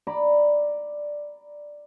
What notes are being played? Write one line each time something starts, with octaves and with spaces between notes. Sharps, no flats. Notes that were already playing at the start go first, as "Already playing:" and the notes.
D5 A#5 B5